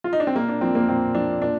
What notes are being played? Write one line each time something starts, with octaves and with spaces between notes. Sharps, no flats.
F4
D#4
D4
C4
A#2 A#3
D4
F3 C4
A#3
A#2 C4
F3 D4
A#2 D4